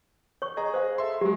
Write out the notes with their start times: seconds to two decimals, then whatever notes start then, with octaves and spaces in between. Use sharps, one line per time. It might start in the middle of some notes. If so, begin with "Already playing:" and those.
0.42 C#5 C#6
0.57 G#4 D#5 A#5
0.74 C5 F5
0.98 A4 E5 C6
1.21 F#3 G#3 G4